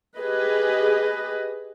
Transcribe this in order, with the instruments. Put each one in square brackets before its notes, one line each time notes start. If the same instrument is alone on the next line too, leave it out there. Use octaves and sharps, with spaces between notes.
[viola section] G4 G#4 B4 D#5